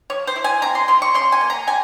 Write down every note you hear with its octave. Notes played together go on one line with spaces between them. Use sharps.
F3 C#5
C5
E4
G#5
C4 A#5
C6
F3 C6
C#6
C#3 C6
G#5
A#3
A#5
G3 G#5